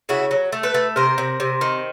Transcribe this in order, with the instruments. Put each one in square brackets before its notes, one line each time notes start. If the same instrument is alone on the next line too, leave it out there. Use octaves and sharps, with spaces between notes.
[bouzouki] C#3 E4 F#4
F#3
A3
A4 B4
A3
C3 A#4 C5
C3
C3
D#3